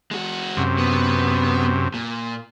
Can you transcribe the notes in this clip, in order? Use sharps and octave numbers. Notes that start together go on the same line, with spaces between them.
G#3 F#4
F#2 C3
B3
A#2